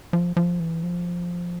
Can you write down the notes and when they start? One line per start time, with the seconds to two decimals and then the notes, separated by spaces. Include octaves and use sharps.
0.13 F3
0.37 F3
0.60 E3
0.83 F3